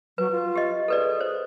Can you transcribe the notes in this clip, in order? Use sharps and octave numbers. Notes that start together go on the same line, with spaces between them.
F#3 B4
F4
G4 D#5
G#4 A4 B4 D5
C5